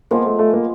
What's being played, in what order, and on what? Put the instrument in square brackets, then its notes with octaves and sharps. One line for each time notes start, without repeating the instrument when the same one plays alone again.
[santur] F3 G#3 B3 [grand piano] A#3
[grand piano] A3
A3
A#3